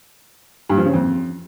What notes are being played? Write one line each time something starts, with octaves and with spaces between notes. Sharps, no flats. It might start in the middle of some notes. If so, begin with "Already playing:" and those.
G2
F3
C#3
F2